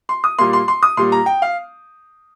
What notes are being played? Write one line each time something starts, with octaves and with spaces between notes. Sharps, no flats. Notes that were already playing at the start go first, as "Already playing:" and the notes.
C6
D#6
A#2 G3 A#3 C6
C6
C6
D#6
A#2 G3 A#3 C6
A#5
G5
F5